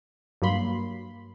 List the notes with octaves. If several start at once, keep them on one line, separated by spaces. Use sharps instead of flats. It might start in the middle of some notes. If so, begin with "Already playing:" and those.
G2 F#3 A#3 B5 C6